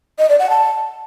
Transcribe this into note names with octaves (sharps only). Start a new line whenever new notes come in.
D#5
D5
F#5
A5